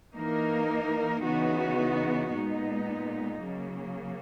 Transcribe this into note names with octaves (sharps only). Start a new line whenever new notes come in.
E3 A#3 D#4 A#4
C#3 E3 B3 D#4 F#4
A#2 G#3 B3 D#4
C#3 F#3 A#3